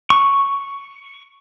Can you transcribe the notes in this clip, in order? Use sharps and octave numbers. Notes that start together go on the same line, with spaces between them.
C#6